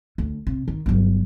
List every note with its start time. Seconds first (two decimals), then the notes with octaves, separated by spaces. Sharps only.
0.18 D2
0.47 C3
0.68 D#3
0.86 G1 F#3